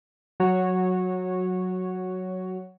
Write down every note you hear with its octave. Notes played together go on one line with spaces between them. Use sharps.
F#3 F#4 C#5